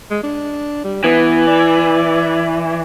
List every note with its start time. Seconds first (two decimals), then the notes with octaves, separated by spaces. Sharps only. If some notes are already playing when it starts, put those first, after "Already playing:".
0.10 G#3
0.23 D4
0.84 G3
1.04 E3 B3
1.47 D5